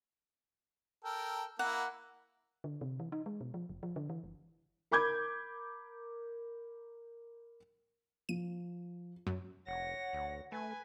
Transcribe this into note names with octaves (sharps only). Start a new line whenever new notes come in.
A4 A#4 G5
A#3 E4 F#5 A#5
D3
C3
E3
D#4
G#3
B2
F3
F1
F3
D3
E3
F#1
A#4 B5 D6 G6 G#6
F3 D#7
F#2
F1 C#5 F#5 A#6
D2
A3 B4 G#5